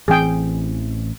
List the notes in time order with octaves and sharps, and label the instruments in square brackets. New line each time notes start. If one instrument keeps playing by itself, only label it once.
[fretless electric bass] A1 E3 C4 [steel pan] G#4 G5